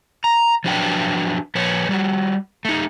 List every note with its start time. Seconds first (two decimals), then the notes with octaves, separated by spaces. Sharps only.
0.24 A#5
0.64 F3 F#3 D4 B4 G5
1.55 F3 B4 C#5
1.89 G3 F#4
2.65 A3 D#4